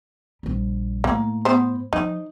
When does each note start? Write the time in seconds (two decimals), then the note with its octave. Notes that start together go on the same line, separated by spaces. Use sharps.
0.43 A#1 G3
1.04 A2 A#3
1.45 B3 C5
1.93 F3 D#4